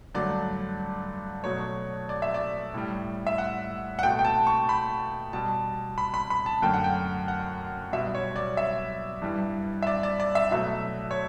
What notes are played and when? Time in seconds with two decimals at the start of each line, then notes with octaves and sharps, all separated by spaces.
0.15 G2 D3 F#3 A3 D5
1.44 B2 F#3 A3 C#5
2.09 D5
2.22 E5
2.34 D5
2.74 A2 G3
3.27 E5
3.38 F#5
3.99 F#5
4.03 B2 A3 G5
4.19 G5
4.25 A5
4.47 C#6
4.69 B5
5.33 B2 G3 A5
5.98 B5
6.14 B5
6.30 B5
6.46 A5
6.62 F#2 D3 A3 G5
6.74 F#5
6.84 G5
7.28 F#5
7.92 B2 G3 E5
8.15 C#5
8.36 D5
8.57 E5
9.22 G2 E3 G3
9.82 E5
9.87 D5
10.03 D5
10.20 D5
10.35 E5
10.51 B2 F#3 A3 E5
11.11 C#5